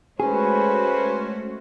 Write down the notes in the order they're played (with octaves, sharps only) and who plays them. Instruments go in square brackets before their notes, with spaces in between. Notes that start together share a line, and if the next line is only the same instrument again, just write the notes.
[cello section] G#3 A3 F#4 [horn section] C#4 [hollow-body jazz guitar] G#4 [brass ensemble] B4 C5